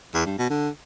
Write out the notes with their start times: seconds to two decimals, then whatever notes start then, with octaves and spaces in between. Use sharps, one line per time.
0.14 E2
0.26 G2
0.38 B2
0.50 D3